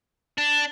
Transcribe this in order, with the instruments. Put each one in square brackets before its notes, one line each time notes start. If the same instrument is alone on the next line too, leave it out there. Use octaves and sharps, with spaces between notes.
[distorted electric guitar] D4